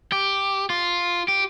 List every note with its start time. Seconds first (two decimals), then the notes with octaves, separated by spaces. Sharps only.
0.12 G4
0.70 F4
1.28 G4